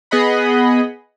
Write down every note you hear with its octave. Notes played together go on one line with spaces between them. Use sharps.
B3 G#4 D#5 F#5 B5